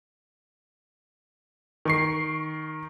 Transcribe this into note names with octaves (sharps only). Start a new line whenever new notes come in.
D#3 C#6 C7